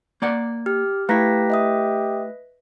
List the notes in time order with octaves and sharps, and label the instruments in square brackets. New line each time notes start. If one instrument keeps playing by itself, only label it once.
[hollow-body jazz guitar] A#3 D5 F#5
[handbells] G4 [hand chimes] F6
[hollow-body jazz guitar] A3 E4 [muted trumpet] G4 [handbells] B4 A#6 B6 [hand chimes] F5 A#5
[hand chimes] D#5 E5 D#6